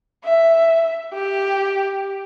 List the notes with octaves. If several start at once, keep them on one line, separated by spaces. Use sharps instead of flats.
E5
G4